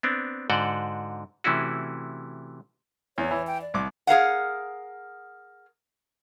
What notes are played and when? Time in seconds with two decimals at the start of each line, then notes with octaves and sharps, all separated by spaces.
0.03 B3 C4 D4
0.50 G#2 D3 F#4 D5 F#5 G5
1.44 C3 E3 A3 C#4 E4 F#4
3.18 E2 C#5
3.31 E3
3.47 G5
3.62 D5
3.74 C2 D6
4.07 G#4 A#4 F5 F#5